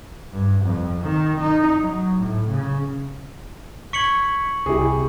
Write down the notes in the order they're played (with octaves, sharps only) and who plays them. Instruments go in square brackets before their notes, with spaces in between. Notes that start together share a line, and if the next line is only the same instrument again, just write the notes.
[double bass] G2
F2
D#3
D#4
F#3
A2
C#3
[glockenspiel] C#6 C#7 F#7 [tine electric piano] G#6 B6
[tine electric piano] C2 C3 E4 [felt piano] G4 G#4